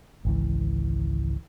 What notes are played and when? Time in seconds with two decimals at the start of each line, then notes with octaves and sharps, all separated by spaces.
0.25 G#1 C#2 E3